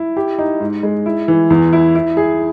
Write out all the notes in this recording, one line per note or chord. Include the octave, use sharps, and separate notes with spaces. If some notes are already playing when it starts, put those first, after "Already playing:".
Already playing: E4
G4
D#4
G#2
G#3
E4
E3
E2
E4
E4
G#4